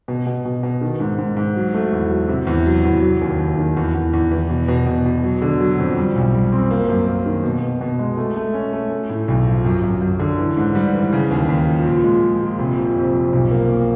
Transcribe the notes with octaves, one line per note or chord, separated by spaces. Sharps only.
B2
B2
B2
B2
D#3
G#2
G#2
G#2
F#3
A3
E2
F#3
C3
E2
F#3
E2
F#3
D#2
D#2
D#3
E2
E2
E2
E3
B2
B2
B2
B2
F#3
D3
F#3
F2
G3
B1
G3
C4
A#3
F#2
A#3
D#3
B2
B2
B2
G#3
A3
A3
C#4
A3
A3
A2
B1
F3
F#2
F#2
F#2
D3
E3
G#2
G3
E3
C#3
D#2
D#2
F3
A#2
G#3
F3
A#2
F1
F3
F2
F3
B1
A#3
A#3